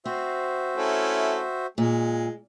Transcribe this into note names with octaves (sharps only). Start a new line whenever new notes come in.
C4 F#4 C5 E5
A3 C#4 E4
A#2 G#3